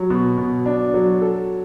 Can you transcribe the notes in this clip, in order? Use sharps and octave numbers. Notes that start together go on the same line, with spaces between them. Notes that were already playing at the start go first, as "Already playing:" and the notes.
Already playing: F#3
B2
B2
D4
F#3
A4